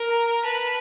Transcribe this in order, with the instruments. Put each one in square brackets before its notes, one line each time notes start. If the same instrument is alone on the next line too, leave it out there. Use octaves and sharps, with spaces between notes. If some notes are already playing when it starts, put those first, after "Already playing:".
Already playing: [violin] A#4
[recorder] A#5
A#5
[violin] B4 [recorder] A5